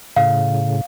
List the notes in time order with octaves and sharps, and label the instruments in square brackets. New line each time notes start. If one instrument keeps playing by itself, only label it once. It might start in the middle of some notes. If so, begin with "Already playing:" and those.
[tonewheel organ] A2 C#3 [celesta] F5